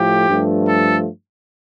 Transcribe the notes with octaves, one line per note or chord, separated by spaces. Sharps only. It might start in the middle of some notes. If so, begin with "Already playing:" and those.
Already playing: A2 F3 A3 G4
G2 F3 A3
A4